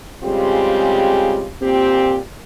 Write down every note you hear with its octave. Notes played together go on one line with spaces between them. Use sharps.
C#3 G3 G#3 C4 F4 G4
A#2 C4 G4